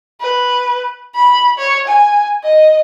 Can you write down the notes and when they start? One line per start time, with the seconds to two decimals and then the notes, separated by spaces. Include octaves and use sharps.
0.21 B4
1.15 B5
1.58 C#5
1.87 G#5
2.43 D#5